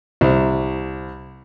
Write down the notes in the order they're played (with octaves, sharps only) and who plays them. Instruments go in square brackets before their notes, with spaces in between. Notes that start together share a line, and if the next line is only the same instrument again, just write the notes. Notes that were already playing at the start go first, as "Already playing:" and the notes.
[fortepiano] C2